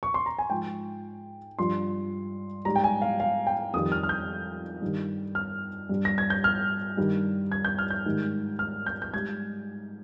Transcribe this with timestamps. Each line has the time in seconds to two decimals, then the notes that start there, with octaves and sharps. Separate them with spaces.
0.03 C#6
0.14 C6
0.26 A#5
0.39 G#5
0.50 G#2 F3 G5
1.58 G2 F3 C6
2.65 G#2 G3 A#5
2.76 G5
2.84 G#5
3.02 F5
3.20 F5
3.47 G5
3.73 F2 D#3 G3 D#6
3.92 F6
4.03 F6
4.09 G6
4.82 G2 D#3 G3
5.35 F6
5.89 G2 G3
6.05 A#6
6.18 G#6
6.30 G6
6.44 F6
6.97 G2 D#3 G3
7.52 G#6
7.65 G6
7.78 F6
7.90 G6
8.06 G#2 D#3 G3
8.59 F6
8.86 G6
9.02 G6
9.13 G#2 G3 G#6